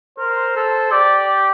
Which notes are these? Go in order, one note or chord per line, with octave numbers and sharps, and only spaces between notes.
A#4 C5
A4
G4 D5